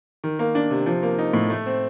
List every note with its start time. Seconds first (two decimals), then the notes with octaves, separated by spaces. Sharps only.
0.24 D#3
0.39 A#3
0.55 D4
0.70 C3
0.86 F3
1.03 A#3
1.19 D#4
1.33 A2
1.50 A3
1.66 C4